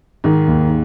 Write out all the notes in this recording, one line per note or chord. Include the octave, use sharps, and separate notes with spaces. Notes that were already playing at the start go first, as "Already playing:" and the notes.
G#2 D#3
D#2